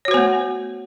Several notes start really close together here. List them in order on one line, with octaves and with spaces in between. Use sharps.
C#5 F#4 C5 B3 A3